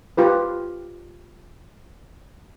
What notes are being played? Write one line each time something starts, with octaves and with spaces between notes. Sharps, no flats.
F4 G4 B4